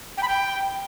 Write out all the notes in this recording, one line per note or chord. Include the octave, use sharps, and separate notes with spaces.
G5
B5
G5